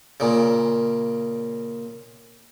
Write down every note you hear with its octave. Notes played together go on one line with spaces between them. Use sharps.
A#2 C#3